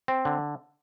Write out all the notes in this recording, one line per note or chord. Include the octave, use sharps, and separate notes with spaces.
C4
D3